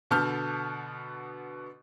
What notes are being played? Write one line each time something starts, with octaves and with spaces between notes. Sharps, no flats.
B2 D3 B3 A5 F6 G6